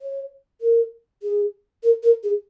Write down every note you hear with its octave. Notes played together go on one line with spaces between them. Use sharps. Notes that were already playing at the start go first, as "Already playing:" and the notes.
C#5
A#4
G#4
A#4
A#4
G#4